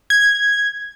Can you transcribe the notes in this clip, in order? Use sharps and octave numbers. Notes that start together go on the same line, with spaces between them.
G#6